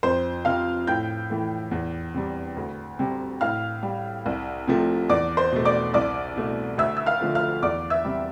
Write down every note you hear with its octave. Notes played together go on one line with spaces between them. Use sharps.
F2 C5 C6
C3 F3 F5 F6
A2 G5 G6
E3 A3
E2
C3 G3
D2
C3 G3
A2 F5 F6
G3
C2
C3 F3 A3
E2 D5 D6
C5 C6
B2 A3
D5 D6
C2 D5 D6
B2 A3
D2 E5 E6
E6
F5 F6
D3 F3 A3
F5 F6
E2 D5 D6
E5 E6
C3 G3